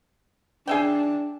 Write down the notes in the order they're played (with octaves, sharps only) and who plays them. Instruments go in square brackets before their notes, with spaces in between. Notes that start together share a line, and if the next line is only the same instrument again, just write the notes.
[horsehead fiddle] D4 [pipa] G#4 E5 G5